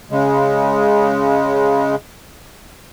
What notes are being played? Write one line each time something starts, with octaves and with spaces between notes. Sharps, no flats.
C#3 G#3